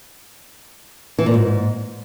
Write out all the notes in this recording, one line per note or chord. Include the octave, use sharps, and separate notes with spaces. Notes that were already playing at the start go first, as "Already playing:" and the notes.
E3
A#2
G#2